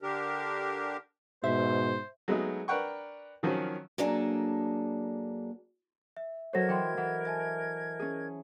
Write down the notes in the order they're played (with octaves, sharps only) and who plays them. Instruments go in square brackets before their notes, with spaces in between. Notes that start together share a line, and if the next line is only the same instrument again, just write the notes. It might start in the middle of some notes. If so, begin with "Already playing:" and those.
[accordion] D3 D4 G4 A#4
[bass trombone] G#2 [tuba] B2 [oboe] C5 [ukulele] E5
[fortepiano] F#3 G#3 A3 B3 D#4
D4 A#4 B4 F#5 G5 C#6
D#3 F3 F#3 C#4
[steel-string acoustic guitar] F#3 A#3 D4 G#4 A4
[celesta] E5
[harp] F#3 A4 C5 [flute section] A#4 D#5 G#6 [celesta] C#5 A#6
[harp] E3 [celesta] A4 G5 C6
[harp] E3 [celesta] F#5
[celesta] E5 G#5 A5
[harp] C#4 G#4